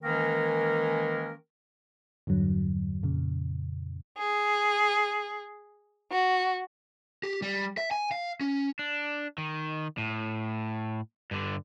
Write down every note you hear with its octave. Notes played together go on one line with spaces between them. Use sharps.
D#3 E3 G#3 A#3 C#4 A#4
E2 G2 D3 F#3
F2 A#2 C#3
G#4
F#4
G4
G3
E5
G#5
F5
C#4
D4
D#3
A2
G2 D3